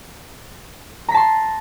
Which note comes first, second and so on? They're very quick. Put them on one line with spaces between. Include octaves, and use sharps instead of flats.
A#5 B6 A5 C6